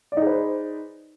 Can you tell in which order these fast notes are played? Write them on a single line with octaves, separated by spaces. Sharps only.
D5 D#4 G#4 B4 C5